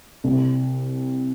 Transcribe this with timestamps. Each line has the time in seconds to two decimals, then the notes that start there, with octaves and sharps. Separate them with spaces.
0.24 C2